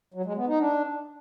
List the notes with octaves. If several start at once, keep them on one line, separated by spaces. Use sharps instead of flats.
F#3
G#3
B3
D#4
D4